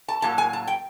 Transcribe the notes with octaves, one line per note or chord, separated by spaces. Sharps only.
A5
A2 F#3 A#3 A5
G#5
A5
G5